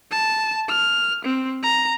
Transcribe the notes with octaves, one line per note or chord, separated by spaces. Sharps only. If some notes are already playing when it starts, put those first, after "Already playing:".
A5
F6
C4
A#5